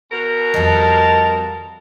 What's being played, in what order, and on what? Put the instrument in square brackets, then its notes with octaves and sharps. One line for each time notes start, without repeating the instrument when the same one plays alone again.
[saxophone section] B2 A#4
[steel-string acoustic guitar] F2 G3 [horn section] D#5 A5